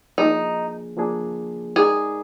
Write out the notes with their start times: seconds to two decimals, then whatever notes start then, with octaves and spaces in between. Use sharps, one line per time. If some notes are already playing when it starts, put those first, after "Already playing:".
0.18 F3 A#3 D4 D#4 G#4
0.97 F3 A#3 D4 G#4
1.76 G#3 D#4 G#4 A#4 D5